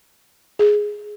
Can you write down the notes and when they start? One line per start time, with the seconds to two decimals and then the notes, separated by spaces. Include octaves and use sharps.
0.59 G#4